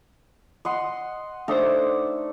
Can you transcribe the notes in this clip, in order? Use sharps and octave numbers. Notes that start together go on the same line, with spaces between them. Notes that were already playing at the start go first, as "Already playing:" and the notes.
D#5 F#5 C6
A3 D4 D#4 C5